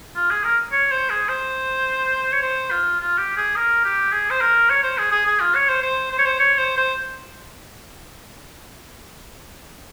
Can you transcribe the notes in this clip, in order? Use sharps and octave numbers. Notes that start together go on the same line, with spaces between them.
F4
G#4
A#4
C#5
C5
G#4
C5
C#5
C5
F4
F4
G4
G#4
A#4
G4
G#4
C5
A#4
C#5
C5
G#4
G#4
G#4
F4
C#5
C5
C5
C5
C#5
C5
C#5
C5
C5